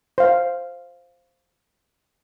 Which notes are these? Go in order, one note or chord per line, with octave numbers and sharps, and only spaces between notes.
C5 F5